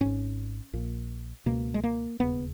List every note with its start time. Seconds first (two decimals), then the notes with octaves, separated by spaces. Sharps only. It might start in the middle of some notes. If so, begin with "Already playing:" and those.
0.01 G#1 G#2 C#4
0.73 A#1 A#2
1.46 C#2 B2 A#3
1.74 G#3
1.84 A#3
2.19 E1 D#2 C#3 B3